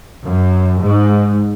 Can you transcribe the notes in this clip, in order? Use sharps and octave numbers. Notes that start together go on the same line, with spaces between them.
F#2
G#2